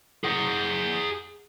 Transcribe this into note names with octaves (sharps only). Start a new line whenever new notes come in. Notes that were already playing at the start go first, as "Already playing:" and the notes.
G#4 F#5